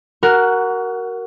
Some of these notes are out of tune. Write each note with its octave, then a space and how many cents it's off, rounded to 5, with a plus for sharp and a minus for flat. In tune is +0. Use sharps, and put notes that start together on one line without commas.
F#4 +25 A#4 +0 F#5 +0